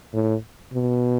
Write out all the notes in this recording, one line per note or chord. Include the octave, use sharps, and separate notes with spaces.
A2
B2